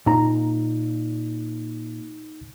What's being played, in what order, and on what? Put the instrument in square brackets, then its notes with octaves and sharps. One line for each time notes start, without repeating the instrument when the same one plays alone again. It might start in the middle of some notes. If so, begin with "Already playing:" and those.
[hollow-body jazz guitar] A#2 A#5 [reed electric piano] D#4